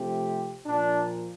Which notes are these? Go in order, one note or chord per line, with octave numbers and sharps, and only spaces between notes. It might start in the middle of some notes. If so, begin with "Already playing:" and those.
Already playing: C3 F3 A3 C4 G4
A#2 F3 A#3 D4